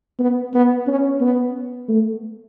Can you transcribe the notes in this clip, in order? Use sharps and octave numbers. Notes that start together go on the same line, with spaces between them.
B3
B3
C#4
B3
A3